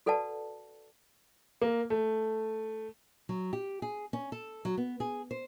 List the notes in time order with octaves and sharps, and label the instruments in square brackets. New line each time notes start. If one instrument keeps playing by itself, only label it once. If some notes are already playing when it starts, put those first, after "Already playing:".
[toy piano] F#4 A4 B4 D5 F#5 A5
[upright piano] A#3
A3
[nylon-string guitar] F#3
G4
G#4
C#4
A4
F#3
B3
G#4
C5